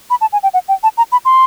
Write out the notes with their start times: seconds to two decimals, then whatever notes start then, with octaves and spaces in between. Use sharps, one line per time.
0.10 B5
0.21 A5
0.33 G#5
0.43 G5
0.54 F#5
0.68 G5
0.83 A5
0.98 A#5
1.12 B5
1.25 C6